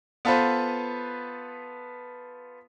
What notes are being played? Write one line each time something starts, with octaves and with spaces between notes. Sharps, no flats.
B3 F4 A4 B4 C5